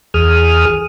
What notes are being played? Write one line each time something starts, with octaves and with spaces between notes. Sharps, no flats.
E2 G#4 D#6 F6